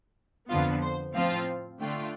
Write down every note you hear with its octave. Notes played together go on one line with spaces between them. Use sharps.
F2 D3 F3 B3 F4
C5
A2 F3 C4 F4 F5
D3 A3 D4 F4 G5